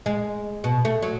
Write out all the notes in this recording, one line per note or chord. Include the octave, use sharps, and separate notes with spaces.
G#3
B2
A3
F#3